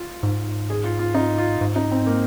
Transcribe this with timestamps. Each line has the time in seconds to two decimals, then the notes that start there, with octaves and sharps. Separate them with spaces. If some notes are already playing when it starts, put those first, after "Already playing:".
Already playing: F4
0.23 G#2
0.70 G#4
0.84 F4
0.99 F4
1.14 D#4
1.38 F4
1.61 G#2
1.76 D#4
1.92 C4
2.06 A#3